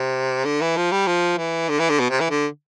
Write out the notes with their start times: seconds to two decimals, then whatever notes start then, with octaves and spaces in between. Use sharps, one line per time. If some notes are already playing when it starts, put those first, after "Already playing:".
Already playing: C3
0.45 D3
0.61 E3
0.77 F3
0.92 G3
1.07 F3
1.38 E3
1.69 D3
1.79 E3
1.90 D3
2.00 B2
2.10 C3
2.20 E3
2.30 D3